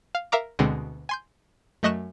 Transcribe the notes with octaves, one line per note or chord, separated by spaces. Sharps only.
F5
A#4 E5 F5 A#5 D6
D2 B2 D3 G#3 C4
G#5 C6 G6
F#2 A3 D#5 C#6 F#6 E7